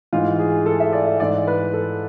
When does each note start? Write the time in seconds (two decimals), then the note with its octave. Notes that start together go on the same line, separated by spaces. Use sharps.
0.13 G#2 E3 F4
0.39 G#4
0.66 A4
0.80 E5
0.93 D5
1.07 E5
1.20 G#2 E3 D5
1.47 B4
1.74 A4